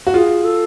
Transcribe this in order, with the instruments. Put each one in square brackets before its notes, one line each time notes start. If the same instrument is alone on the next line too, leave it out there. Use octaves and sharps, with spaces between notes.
[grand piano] F#4
[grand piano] F4 [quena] G#4
[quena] A4